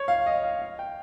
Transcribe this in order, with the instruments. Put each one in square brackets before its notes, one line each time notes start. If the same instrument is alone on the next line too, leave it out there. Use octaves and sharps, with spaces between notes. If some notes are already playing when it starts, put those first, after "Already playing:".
Already playing: [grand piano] C#5
F5
D#5
F5
F5
G5